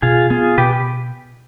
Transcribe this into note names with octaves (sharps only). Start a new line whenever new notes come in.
B2 F4 G#4
B3 F4 G#4
B2 G4 B4